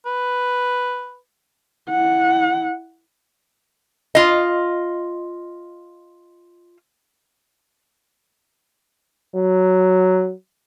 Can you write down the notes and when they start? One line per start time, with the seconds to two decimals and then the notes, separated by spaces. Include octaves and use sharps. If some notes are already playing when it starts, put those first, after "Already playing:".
0.06 B4
1.89 E4 F#5
4.15 F4 D#5
9.35 F#3